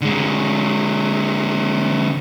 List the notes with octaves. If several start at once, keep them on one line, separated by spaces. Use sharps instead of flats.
D3 G#3